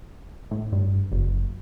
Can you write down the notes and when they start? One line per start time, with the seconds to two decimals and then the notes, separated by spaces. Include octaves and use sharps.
0.51 A2
0.72 G2
1.12 F#1